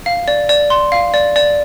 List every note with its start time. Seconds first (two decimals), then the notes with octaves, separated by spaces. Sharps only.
0.06 F5
0.28 D5
0.49 D5
0.70 C6
0.92 F5
1.14 D5
1.36 D5